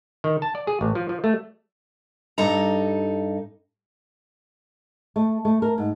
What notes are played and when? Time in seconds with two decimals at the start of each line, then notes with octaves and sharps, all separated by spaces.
0.24 D#3
0.42 A5
0.55 D5
0.67 G#4
0.81 A1
0.95 F3
1.09 F3
1.24 A3
2.38 G2 D#4 A4 A#5
5.16 A3
5.45 A3
5.62 A#4
5.78 G#2